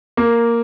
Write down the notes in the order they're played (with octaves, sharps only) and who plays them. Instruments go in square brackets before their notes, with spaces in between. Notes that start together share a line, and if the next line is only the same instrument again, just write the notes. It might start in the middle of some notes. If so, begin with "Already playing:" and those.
[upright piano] A#3